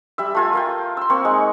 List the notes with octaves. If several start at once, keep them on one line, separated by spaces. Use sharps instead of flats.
G3 E5 E6
A3 F4 G#5
A#4 F5 G5
C6 E6
A#3 C4 C#6
G#3 D#4 C#6